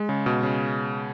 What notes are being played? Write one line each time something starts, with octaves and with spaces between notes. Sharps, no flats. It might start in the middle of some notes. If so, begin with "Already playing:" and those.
Already playing: G#3
C#3
B2
C#3